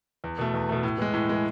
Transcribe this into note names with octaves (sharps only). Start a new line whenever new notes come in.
E2
B2 A3
E2
B2 A3
A2
E3 G#3
A2
E3 G#3